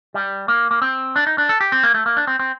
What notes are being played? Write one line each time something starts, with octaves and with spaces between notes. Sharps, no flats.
G3
A#3
A#3
C4
D4
D#4
D4
A4
G4
C4
A#3
A3
A#3
D4
C4
C4